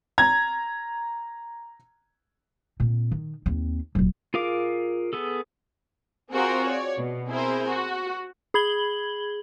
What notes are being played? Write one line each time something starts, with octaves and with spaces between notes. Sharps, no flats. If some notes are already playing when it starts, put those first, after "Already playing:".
A#5 G#6
A#2 C4
D#3
D#2 C4
D#1 F#3
F4 G#4 A#4 F5 D6
B3 G#4 A4
C4 F4 F#4 G#4 A#4 C5
C#5 D5
B2
C4 E4 G#4 A#4 C5
F#4
G#4 B5 G#6 F#7 G7